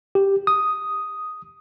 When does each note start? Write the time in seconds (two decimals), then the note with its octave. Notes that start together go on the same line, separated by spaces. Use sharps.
0.15 G4
0.47 D#6